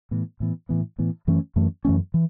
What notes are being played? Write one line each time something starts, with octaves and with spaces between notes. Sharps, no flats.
A2 E3 B3
A2 E3 B3
A2 E3 B3
A2 E3 B3
F#2 E3 A3 C#4
F#2 E3 A3 C#4
F#2 E3 A3 C#4
E3